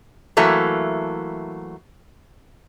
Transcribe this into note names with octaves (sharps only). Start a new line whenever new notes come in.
E3 F#3 A3 A#3